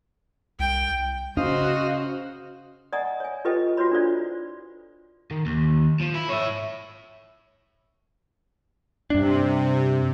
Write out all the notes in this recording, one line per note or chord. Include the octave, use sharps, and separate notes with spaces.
C2 G5
C#3 C#4 F#4 C5 D#5 F5
D5 D#5 F#5 G#5 A#5 D#6
C#5 G#5
F4 G4 A4 B4 D#5 G5
F4 F#4 B4 C#5 B5
D4 E4 A4 C5 D5 F5
D#3
D#2
F3
E4
C#5 E5
G2 C3 D4